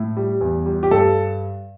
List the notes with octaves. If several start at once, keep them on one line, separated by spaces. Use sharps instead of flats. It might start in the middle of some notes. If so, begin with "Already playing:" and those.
Already playing: A2
G3
E2
G3
G4
G2 A4